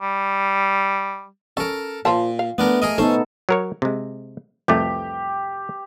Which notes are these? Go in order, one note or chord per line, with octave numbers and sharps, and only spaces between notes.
G3
C#4 A4 A#4
A#2 F3 F4 A5
F5
A3 B3 D4 A#4
G#4 A#4 D#5
B3 C#4 D#4 A4 C5
F#3 A#4 C#5
C3 G#3
C2 F2 A3 G4